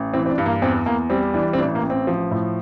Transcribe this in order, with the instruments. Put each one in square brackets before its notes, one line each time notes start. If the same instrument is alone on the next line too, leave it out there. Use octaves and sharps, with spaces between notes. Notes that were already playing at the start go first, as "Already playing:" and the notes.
Already playing: [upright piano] A1
E3 C4
C4
D4
G2
A#3
E2 C4
E2 A#3
G3 C4
E3 D4
C4
A1 D4
A#3
A1
C4
F3
A2